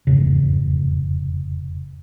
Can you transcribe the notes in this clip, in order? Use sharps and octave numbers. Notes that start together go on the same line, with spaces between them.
F1 E2 G#2 C#3